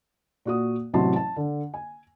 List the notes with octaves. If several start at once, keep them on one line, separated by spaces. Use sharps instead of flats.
A#2 F#4 D#6
A1 C3 E3 F#3 A5 C6
A5
D3
G#5